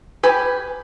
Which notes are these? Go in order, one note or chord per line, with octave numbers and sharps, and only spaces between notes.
G4 B4 G#5